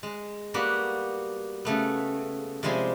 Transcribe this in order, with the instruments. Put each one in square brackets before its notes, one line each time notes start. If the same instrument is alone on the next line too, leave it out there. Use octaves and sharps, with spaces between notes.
[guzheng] G#3
G3 A#3 B3 F#4 G4
C#3 A3 B3
C3 F3 G3 G#3 C5 G#5